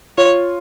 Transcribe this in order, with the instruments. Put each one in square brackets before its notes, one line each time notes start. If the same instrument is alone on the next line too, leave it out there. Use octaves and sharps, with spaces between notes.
[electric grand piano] F4 [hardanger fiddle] C#5